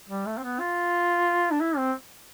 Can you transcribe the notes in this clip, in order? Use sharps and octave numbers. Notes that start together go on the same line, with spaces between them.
G3
A3
C4
B3
F4
D4
E4
C4